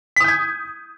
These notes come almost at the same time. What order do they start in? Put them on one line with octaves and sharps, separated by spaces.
B6 D#6 G6 G#6